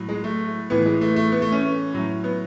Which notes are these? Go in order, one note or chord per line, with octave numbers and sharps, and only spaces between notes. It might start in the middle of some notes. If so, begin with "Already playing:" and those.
Already playing: A2 F#3
G#3
A3
A2 E3 B3
G#3
A3
A3
B3
A3
C#4
A2 F#3
B3